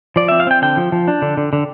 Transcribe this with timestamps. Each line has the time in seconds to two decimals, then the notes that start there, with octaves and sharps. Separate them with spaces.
0.16 F3 D5
0.28 C4 E5
0.40 F5
0.47 C4 G5
0.62 D3 G5
0.77 F3
0.92 F3
1.08 D4
1.22 D3
1.37 D3
1.53 D3